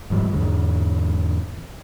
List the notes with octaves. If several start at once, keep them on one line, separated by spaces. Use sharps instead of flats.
D#1 G#2 F3 G3
E2 G#2 D3 G#3